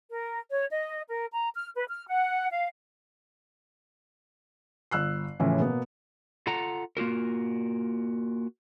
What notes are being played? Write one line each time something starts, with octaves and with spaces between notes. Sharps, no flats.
A#4
C#5
D#5
A#4
A#5
F6
B4
F6
F#5
F5
G1 E6 F#6 C7
A2 C#3 E3 F3
B2 A#3 B3
F4 A4 F#5 A#5
A#3 F4 F#4 A#4